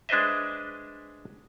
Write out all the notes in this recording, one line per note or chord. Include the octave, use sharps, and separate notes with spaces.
G#3 D4 B4 C5 D#5 E5